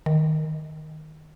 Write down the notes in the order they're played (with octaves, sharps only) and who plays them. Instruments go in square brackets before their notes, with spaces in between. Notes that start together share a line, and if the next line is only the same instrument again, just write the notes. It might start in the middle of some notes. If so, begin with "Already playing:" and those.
[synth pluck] D#3